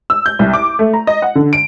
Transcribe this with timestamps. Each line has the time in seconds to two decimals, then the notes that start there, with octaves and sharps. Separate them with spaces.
0.10 E6
0.26 G6
0.39 C2
0.53 D6
0.79 A3
0.93 A#5
1.07 D#5
1.22 F#5
1.35 D3
1.53 D7